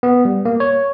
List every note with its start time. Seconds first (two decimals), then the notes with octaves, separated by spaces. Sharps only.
0.03 B3
0.25 G3
0.45 A#3
0.60 C#5